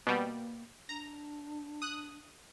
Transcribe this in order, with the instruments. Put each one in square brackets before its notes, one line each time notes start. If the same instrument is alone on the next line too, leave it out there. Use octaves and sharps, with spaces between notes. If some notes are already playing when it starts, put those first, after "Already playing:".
[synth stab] B2 G3 [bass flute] A#3
[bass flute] D4 [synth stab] A#5
[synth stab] D#6 F#6